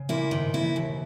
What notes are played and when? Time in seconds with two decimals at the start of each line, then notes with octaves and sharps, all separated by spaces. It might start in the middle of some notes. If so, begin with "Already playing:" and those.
Already playing: C#3
0.09 A#2 A#3 E4
0.31 G#2 D#3
0.46 B2
0.54 A#3 E4
0.61 E3
0.75 D#2 E3